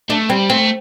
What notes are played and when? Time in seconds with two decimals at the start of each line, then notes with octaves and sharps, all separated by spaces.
0.09 A3 D4
0.29 G3 C4
0.49 A3 C4